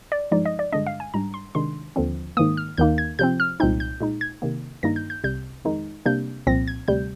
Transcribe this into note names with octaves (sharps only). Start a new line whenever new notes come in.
D5
G2 F3 G#3 D#4 D5
D#5
D5
G2 D3 G#3 D4 D#5
F5
G#5
G#2 G3 D4 A#5
C6
C3 D#3 G#3 D4 C6
D#2 D3 F3 C4
G#2 D#3 A#3 D#6
F6
D#2 D#3 A#3 D#4 G6
G#6
C3 F3 C4 G6
F6
C2 A#2 G#3 C4 D#4 G6
G6
A#2 G#3 D#4
G#6
C3 D#3 A#3
G2 D#3 G3 A#3 D#4 A#6
G6
G6
C2 C3 G3 G6
F2 D#3 G#3 D#4
C3 G3 A#3 D4 G6
C2 A#2 F3 C4 A#6
G#6
D2 C3 G3 G6